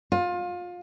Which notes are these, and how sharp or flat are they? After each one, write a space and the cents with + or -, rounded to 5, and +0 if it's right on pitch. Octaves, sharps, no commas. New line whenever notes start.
F4 +25